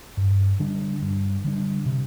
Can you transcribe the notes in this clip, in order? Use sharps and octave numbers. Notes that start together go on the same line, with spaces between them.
G2
D3 G3 D4
G2
D3 G3 D4
C3